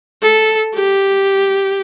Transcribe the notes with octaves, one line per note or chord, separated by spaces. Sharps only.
A4
G4